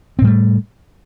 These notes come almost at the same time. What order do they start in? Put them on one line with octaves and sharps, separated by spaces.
C4 A2 G3 A3